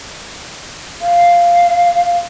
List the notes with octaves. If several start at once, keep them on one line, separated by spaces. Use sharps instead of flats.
F5